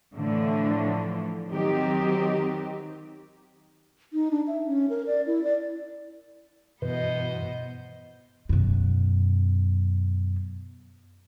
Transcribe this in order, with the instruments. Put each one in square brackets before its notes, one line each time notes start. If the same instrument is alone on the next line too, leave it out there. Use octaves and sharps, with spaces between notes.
[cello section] A2 D3 E3 F3 A3
D#3 F#3 C4 D#4 G4
[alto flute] D#4
D4
E5
C#4
A#4
D5
E4
D5
[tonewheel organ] G2 E3 [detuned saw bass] B2 [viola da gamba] B3 C5 D#5
[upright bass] F#2 B2